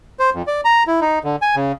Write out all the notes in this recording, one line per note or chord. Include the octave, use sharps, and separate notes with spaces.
C5
F2
D5
A#5
E4
D#4
D3
G#5
C#3